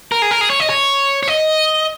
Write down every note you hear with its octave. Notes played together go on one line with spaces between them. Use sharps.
A#4
G#4
A#4
G#4
C#5
D#5
C#5
C#5
D#5